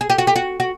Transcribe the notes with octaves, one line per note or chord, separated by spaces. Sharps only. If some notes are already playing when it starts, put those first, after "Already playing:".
G#4
G4
F#4
G4
F#4
F#4